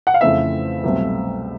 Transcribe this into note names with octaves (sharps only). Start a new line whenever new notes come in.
F#5
F5
F2 C#3 E3 A3 C4 E5
C2 B2 F#3 A3 C4